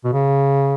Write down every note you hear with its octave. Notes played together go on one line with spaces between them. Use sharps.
B2
C#3